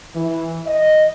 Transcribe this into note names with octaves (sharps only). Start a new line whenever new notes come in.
E3
D#5